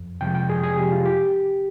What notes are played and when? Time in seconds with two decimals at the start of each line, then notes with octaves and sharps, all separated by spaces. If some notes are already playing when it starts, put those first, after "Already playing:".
Already playing: F2
0.21 C3 F3 G#3 G5
0.35 G5
0.49 F2 G#4
0.63 G#4
0.77 C3 F3 G#3 G4
0.92 F4
1.06 G4